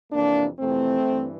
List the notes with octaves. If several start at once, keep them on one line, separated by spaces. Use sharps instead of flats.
F2 C3 E3 A#3 D4
F2 C3 E3 A3 C4
G2 E3